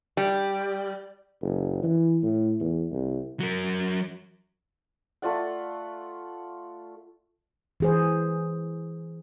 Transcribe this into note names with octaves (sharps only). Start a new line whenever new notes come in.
G3
F#1
E3
A2
E2
C2
F#3 A#4
A3 F4 D5 F#5
E3 G#4 C5